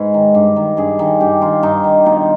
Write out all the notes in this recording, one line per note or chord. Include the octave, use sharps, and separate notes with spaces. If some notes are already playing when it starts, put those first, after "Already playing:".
Already playing: G#2 G#3 G#4 B4
D#3
G2
D#3
G2 G#4
D#3
G2 G4
D#3 F4
G2 D#4
D#3
B2 D#4